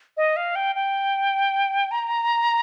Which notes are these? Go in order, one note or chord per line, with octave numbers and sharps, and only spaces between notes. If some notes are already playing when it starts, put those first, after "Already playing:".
D#5
F5
G5
G5
A#5